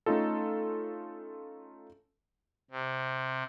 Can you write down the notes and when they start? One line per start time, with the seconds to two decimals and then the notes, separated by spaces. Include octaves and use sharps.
0.06 A3 C#4 D#4 F4 A4
2.71 C3